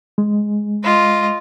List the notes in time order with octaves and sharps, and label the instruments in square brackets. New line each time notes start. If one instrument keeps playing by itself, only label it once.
[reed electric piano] G#3
[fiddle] F4 D#5